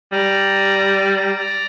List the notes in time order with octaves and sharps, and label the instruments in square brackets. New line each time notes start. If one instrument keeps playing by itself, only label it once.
[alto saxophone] G3 [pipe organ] D5 A#5